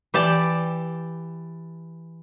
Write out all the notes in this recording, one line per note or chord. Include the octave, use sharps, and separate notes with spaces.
E3 G4 D5 A5